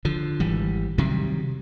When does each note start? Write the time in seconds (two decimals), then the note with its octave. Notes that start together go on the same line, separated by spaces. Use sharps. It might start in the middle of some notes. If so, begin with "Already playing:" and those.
0.05 D3 F3
0.40 G#1 E3 G3
0.98 C3 D#3 F#3 G3